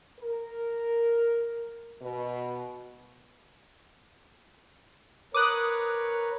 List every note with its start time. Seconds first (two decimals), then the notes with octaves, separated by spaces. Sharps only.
0.20 A#4
2.02 B2
5.34 A#4 B4 C#5 D6 D#6 F#6